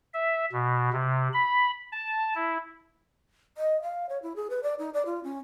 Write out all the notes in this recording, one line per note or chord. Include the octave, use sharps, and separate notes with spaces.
E5
B2
C3
B5
A5
E4
D#5
F5
C#5
E4
G#4
B4
D5
D#4
D5
F4
C#4